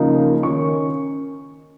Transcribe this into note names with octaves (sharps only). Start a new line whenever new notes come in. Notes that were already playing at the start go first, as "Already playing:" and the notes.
Already playing: C#3 F3 A#3 D#4
D#3 C#4 C#6